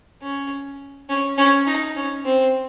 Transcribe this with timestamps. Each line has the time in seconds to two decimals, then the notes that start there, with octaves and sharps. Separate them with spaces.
0.22 C#4
1.09 C#4
1.38 C#4
1.67 D#4
1.96 C#4
2.25 C4